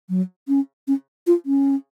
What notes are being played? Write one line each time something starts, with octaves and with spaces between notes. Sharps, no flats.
F#3
C#4
C#4
F4
C#4